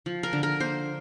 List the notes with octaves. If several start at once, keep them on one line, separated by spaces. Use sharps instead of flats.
F3
A#4
D3
A#4
A#3 C5